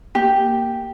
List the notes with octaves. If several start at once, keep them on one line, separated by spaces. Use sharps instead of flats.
A#3 G4